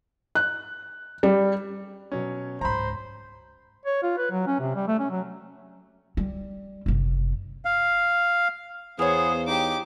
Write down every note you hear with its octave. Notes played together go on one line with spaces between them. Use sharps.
F#6
G3
B2 F#3 C#4
C#2 G#2 C5 A#5 B5
C#5
F4
B4
F#3
C#4
C3
G3
A3
C#4
F#3
G3
F#1 C3
F5
E2 B3 G#4 C5 C#5 F5
D#4 G4 D6